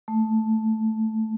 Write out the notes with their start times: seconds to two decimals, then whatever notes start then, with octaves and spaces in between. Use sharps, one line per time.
0.08 A3